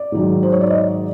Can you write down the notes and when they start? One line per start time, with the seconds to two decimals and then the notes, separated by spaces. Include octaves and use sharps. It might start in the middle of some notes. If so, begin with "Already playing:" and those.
Already playing: D5
0.12 G#2 D#3 F#3
0.43 C5
0.52 C#5
0.61 D5
0.70 D#5